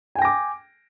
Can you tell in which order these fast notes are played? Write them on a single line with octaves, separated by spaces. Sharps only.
G#5 G5 A#6 D6